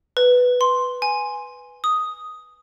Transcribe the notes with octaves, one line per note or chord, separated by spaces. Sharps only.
B4
C6
G#5
D#6